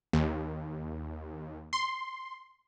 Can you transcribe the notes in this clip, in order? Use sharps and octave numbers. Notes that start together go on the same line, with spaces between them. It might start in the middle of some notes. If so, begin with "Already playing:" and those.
D#2
C6